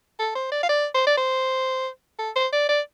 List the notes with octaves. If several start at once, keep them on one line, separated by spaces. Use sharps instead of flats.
A4
C5
D5
F5
D5
C5
D5
C5
A4
C5
D5
D5